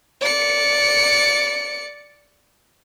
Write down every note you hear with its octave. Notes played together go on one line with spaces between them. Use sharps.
D5 C#7